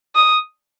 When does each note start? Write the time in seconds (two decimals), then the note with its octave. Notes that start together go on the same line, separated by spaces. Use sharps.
0.15 D#6